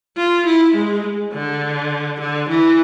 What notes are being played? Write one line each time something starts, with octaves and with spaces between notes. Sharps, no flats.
F4
E4
G#3
D3
D3
E3